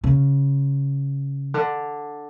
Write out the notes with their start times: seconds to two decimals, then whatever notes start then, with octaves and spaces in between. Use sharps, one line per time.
0.04 C#3
1.54 D3